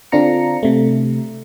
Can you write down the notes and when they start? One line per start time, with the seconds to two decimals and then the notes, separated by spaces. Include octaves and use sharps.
0.12 D3 C4 D4 F4 A#5 C#7
0.63 C3 A3